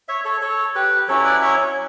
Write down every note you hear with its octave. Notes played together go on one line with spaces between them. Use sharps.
C#5 E5
A4 C#5
A4 C#5
G4 B4
F#3 C#4 E4 A4 C#5
B4 D5
C#5 E5